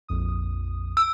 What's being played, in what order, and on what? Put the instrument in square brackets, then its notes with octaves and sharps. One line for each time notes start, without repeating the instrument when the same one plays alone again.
[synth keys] A#1 F2 D#6
[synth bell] E6